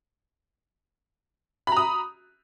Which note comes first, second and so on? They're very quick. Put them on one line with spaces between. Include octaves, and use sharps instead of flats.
B5 A#5 D#6